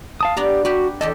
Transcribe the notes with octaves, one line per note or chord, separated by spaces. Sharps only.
F5 A5 D#6
B3 D4 G4 A#5
F#4 G4 B4
E2 G4 A4 D#5